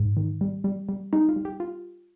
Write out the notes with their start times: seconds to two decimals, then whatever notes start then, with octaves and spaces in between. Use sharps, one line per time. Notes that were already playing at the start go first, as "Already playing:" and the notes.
Already playing: G#2
0.17 D#3
0.41 G3
0.64 G3
0.89 G3
1.13 G3 D#4
1.29 F4
1.36 G3
1.45 G4
1.60 F4